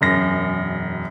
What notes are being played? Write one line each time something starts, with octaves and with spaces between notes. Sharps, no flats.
E1 F#2 A#6